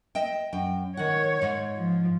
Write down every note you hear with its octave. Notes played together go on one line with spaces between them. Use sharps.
D#5 E5 G5
F#2 G5
D#3 C#5 F#5
G#2
F3